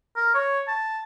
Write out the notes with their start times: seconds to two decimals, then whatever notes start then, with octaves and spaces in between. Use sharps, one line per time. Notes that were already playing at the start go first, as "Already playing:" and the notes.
0.16 A#4
0.35 C#5
0.68 A5